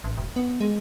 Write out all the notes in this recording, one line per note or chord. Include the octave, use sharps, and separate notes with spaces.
A1
E1
B3
G#3